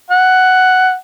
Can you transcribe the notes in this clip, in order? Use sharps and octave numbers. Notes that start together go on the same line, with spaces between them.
F#5